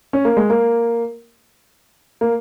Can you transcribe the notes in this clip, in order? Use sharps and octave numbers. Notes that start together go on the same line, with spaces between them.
C#4
A#3
G#3
A#3
A#3